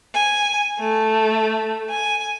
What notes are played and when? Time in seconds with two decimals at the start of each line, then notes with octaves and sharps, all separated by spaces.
0.14 G#5
0.79 A3
1.90 G#5